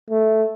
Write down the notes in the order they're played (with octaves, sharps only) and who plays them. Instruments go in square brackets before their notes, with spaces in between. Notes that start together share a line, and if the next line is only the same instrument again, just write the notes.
[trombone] A3